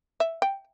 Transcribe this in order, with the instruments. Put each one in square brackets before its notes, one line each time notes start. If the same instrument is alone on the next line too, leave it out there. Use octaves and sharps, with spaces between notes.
[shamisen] E5
G5